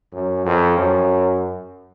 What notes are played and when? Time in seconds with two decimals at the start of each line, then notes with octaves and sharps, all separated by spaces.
0.13 F#2
0.45 F2
0.78 F#2